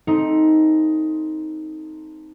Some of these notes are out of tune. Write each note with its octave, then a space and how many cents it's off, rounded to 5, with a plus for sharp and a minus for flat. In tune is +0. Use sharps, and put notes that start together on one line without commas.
A3 +0 C4 +0 D#4 +10